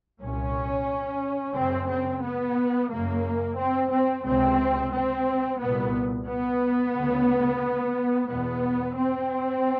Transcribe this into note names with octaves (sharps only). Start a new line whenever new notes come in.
C2 A#2 C#4
F#2 C#3 C4
C4
B3
F#2 C#3 A#3
C4
C4
C#2 C3 C4
C4
C2 A#2 B3
B3
D2 C#3
E2 B2 B3
C4